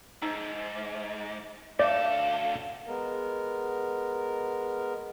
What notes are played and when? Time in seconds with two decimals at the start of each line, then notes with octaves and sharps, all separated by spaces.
0.22 G#2 D#4 A#5 E6
1.79 D2 A4 C#5 D5 E5 F5 D6
2.87 G#3 B3 A#4